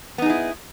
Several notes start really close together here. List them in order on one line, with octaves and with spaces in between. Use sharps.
B3 D#4 G#4 E4